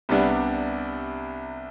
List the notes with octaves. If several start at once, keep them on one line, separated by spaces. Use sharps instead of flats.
C2 C3 G3 B3 D4